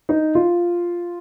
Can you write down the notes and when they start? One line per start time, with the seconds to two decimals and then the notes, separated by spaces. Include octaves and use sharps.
0.09 D#4
0.35 F4